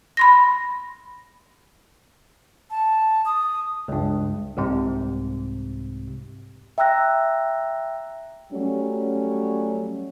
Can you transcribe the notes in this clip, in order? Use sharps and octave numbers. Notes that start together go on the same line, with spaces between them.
B5 C6 A#6
A5
D#6
C#2 G2
C2 G#2 C3
E5 G5 A#5 E6 F#6 A#6
F#3 G3 A3 C#4